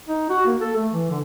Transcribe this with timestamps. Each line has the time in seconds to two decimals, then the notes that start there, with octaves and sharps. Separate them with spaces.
0.09 D#4
0.30 F#4
0.46 A#3
0.61 A4
0.76 A3
0.92 E3
1.11 D3